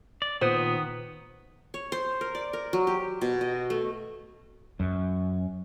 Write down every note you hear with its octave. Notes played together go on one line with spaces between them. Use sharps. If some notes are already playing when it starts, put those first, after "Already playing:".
D5
A#2 D#3 B3 C5 D#6
C#5
C5
A#4
D5
A#4
F#3
G4
B2
D#5
A3
F#2